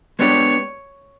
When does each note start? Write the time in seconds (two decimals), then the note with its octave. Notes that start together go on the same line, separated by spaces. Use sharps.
0.19 G#3 B3 D4 G4 C#5